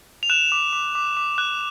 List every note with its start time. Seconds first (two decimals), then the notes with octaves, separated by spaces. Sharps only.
0.23 F7
0.30 F#6 E7
0.52 D6
0.73 D6
0.95 D6
1.17 D6
1.38 F#6